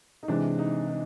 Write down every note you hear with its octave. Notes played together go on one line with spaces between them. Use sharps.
D#4
C3 E3 G#3 D4
D#4
D#4